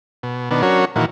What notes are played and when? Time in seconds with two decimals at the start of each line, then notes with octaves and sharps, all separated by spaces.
0.23 B2
0.51 B2 D#3 B3 D4
0.62 F#3 C#4 D4 F#4 A#4 C#5
0.96 A#2 D#3 E3 F#4